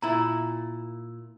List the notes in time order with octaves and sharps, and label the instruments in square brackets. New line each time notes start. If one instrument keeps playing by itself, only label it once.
[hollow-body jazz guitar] A#2 E4 [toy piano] A#5